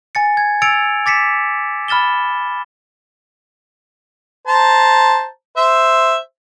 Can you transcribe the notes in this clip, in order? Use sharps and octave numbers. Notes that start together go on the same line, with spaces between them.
G#5 A6 C#7
G#6
E6 G#6 A6 C#7 D7 F7
D6 A6 B6 C#7 E7
B5 F6 A6 E7 G7
C5 A5 A#5
C5 E5